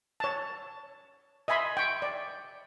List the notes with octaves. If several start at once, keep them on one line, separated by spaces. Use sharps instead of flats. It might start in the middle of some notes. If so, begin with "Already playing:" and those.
C#5 A5
D#5 E5 G#5 B5 C6
G5 C#6
D5